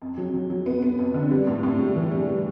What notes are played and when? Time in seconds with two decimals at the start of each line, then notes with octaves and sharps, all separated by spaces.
0.02 F2
0.18 F#3
0.34 F#3
0.50 F#3
0.66 B3
0.82 B3
0.99 F2
1.14 D3
1.31 G3
1.47 A2
1.63 A2
1.80 G3
1.95 E3
2.11 G3
2.27 G3